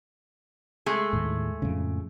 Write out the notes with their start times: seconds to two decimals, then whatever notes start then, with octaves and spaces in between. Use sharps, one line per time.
0.86 G#3 A3 G#4
1.13 D#2 A2
1.62 F2 A2 C#3